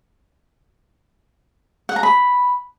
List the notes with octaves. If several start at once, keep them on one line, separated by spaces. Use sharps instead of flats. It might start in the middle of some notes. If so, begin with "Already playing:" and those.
F#5
A#5
B5